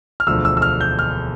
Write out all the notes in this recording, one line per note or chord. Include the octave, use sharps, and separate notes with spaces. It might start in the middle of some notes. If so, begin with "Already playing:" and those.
F6
E1 D2 D3 F3 E6
E6
E6
F6
G6
F6